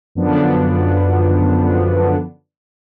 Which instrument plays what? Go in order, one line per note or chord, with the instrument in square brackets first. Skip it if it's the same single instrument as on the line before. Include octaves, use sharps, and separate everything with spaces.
[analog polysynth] F#2 D3 F3 B3 D4